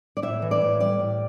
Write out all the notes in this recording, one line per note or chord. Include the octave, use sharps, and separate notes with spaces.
D5
A2 E5
E3
D5
A2
G3 D5
A2